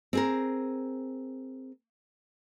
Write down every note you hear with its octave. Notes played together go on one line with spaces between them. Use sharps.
C4 G#4 A#4